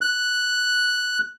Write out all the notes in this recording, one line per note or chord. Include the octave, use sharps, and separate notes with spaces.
F#6